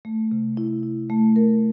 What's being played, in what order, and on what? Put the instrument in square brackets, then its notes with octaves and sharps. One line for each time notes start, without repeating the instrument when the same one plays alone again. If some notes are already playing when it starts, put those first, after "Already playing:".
[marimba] A3
C3
E4
E4
A3
A#4